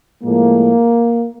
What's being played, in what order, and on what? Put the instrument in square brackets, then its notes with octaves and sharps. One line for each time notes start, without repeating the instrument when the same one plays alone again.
[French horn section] A2 F3 G#3 A#3